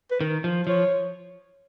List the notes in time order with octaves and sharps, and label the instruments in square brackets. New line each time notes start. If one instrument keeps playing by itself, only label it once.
[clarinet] B4
[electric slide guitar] D#3 [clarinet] A#4
[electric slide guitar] F3
[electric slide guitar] F3 [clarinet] C#5